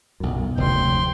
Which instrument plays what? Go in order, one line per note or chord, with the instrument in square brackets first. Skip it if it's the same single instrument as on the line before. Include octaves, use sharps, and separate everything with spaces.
[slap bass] B1 F#2
[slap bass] F1 D2 [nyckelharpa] G5 C6